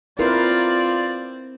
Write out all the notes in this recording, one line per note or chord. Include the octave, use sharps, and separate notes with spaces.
C4 E4 F4 A#4 B4 D5